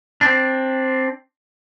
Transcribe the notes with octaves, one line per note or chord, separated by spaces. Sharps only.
C4 D4